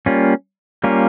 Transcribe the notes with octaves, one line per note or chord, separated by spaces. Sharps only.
G3 A#3 C#4 F4
G3 A#3 C#4 F4